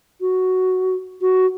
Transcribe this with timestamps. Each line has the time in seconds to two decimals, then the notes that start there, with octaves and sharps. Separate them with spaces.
0.21 F#4
1.21 F#4